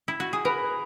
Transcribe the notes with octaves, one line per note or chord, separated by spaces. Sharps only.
E4
F#4
G#4
A#4 B4